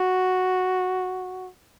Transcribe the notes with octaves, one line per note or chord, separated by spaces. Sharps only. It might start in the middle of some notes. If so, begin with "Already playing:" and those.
Already playing: F#4